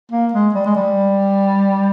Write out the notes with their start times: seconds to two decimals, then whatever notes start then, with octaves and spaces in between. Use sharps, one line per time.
0.12 A#3
0.33 G#3
0.55 G3
0.66 G#3
0.76 G3